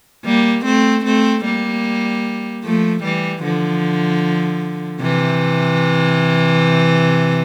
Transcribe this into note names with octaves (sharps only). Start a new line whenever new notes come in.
G3 A#3
A3 C4
A3 C4
G3 A#3
F3 A3
E3 G3
D3 F3
C3 E3